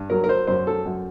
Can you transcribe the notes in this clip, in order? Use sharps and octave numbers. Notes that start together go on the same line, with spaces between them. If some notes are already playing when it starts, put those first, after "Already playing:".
Already playing: G2
F#3 A#4
A#4
C5
F#2 C5
A4
F#2